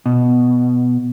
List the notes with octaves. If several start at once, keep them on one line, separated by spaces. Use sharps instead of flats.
B2